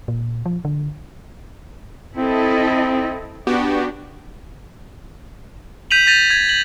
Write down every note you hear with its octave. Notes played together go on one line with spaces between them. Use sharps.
A#2
F3
D3
C4 E4 A4 D#5
B3 D4 F#4 G4
G6 B6 D#7 F7 F#7
G6 A6 A#6 D#7 F7
G#6
F#7